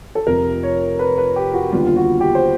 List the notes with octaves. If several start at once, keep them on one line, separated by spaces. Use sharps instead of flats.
A4
F1 F2 C3 F3 A#4
C#5
B4
B4
G4
F#4
D#2 D3 G3 B3 F4
F4
F#4
G4
C5